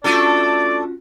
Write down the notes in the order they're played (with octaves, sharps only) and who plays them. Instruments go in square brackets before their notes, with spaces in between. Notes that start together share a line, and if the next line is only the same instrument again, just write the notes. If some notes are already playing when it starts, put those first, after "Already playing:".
[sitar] A3 D4 A4 [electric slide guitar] C#4 F4 F#4 [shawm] D5